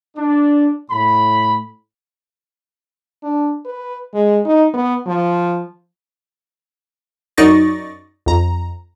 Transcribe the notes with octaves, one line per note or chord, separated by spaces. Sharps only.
D4
A2 B5
D4
B4
G#3
D#4
B3
F3
F#2 D#4 D5 C#6 A6 A#6
F2 A#5